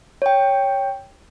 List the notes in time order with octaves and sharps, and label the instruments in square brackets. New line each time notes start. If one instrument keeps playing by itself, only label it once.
[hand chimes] C#5 G5